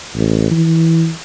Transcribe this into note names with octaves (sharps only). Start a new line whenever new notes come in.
A1
E3